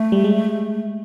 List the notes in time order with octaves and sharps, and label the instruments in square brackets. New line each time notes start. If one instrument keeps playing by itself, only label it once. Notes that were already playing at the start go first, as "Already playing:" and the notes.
Already playing: [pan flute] A3
[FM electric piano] G3
G#3